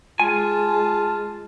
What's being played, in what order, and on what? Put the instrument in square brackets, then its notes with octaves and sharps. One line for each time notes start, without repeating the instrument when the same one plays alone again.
[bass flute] G#3 [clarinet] F4 [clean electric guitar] G#5 [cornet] A5